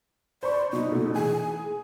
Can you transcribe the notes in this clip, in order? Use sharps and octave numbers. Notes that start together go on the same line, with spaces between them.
C5 D5 B5 C#6
B2 D#4
B2 A3
E3 G#4 G#5